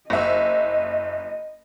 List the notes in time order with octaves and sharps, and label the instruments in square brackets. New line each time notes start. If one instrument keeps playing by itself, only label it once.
[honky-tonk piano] F#1 E5 [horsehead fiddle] D#5